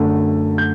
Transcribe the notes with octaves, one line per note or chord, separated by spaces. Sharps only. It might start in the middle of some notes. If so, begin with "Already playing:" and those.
Already playing: F#2 D3 A3
G6